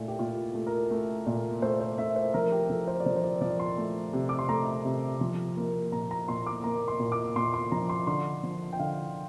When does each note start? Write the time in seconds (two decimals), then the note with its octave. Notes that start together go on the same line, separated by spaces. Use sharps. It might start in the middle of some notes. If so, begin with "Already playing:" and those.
Already playing: A#2 A3 E4
0.08 G4
0.19 A#2 F4
0.55 A3
0.67 A#4
0.91 A3
1.27 A#2
1.62 A3 C5
1.81 C5
1.98 A3 E5
2.16 C5
2.34 F3 A#4
2.52 G4
2.70 F3 A4
2.87 C5
3.00 D5
3.05 F3 C5
3.16 C5
3.24 D5
3.41 F3 D5
3.60 C6
3.78 A3
4.13 C3
4.29 D6
4.39 C6
4.49 A3 A#5
4.85 C3
5.21 F3
5.57 A#3
5.92 A#2 A#5
6.11 A#5
6.28 A#2 C6
6.46 D6
6.64 A#3 A#5
6.88 C6
7.00 A#2
7.12 D6
7.36 A#2 C6
7.54 C6
7.72 F3 A#5
7.89 C6
8.07 D3 C6
8.44 F3
8.73 G5
8.79 D3 F5